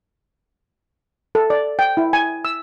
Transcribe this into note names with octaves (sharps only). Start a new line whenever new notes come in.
A4
D5
G5
E4
G#5
E6